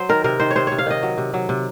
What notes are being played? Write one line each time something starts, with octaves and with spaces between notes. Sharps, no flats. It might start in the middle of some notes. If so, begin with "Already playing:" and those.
Already playing: F#3 C5
D#3 A#4
C3 A#4
D#3 C5
C#5
C3 C5
C3 C#5
F5
D#3 D#5
F#3
C3
F#3
C3